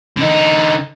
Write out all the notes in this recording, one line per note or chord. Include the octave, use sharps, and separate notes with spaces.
D3 D#4